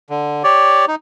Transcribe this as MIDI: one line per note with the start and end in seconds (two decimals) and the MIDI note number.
0.10 0.43 50
0.44 0.85 67
0.44 0.85 73
0.44 0.85 74
0.88 0.95 63